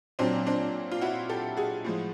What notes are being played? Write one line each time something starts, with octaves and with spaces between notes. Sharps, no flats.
A#2 F#3 C4 D4
C4 D4
F4
E4 F#4
G4 A4
F#4 G#4
A2 F3 G#3